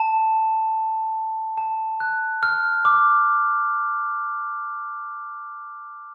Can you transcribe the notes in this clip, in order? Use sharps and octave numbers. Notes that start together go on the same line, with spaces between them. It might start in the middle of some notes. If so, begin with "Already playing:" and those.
Already playing: A5
A5
F#6
F6
D6